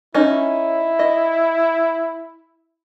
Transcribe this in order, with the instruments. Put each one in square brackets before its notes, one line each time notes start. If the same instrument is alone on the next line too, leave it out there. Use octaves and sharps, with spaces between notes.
[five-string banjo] C#4 D#4 [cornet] E4
[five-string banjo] D#5